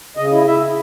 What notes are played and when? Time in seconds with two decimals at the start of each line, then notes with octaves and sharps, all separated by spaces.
0.17 C#3 D#5
0.32 E4
0.46 E4 E5
0.62 E4